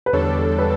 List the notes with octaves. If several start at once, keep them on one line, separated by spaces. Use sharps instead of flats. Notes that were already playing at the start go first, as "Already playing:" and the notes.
B4
E2 D3 G3 D4 A4 C#5
B4